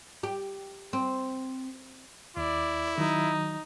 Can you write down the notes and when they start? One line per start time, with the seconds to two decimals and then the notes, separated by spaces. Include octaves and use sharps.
0.23 G4
0.93 C4
2.37 D#2 E4 D5
2.98 D#3 F#3 D#4